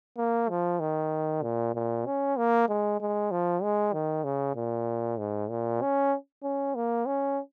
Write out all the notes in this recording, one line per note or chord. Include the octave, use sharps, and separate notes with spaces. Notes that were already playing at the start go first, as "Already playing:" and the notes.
A#3
F3
D#3
A#2
A#2
C#4
A#3
G#3
G#3
F3
G#3
D#3
C#3
A#2
G#2
A#2
C#4
C#4
A#3
C#4